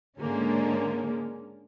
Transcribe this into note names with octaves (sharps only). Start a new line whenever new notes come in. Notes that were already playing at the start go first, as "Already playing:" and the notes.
G#2 D3 G#3 A#3 C#4